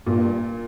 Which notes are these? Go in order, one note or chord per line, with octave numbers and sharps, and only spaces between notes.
G2 A#2